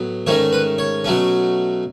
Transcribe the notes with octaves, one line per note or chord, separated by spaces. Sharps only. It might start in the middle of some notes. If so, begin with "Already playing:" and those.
Already playing: A2 F#3 B3
G#2 D#3 A3 C#4 C#5
B4
C#5
B2 F#3 A3 C#4